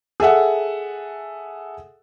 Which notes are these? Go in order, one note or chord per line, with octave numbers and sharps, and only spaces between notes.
G#4 A4 E5 F#5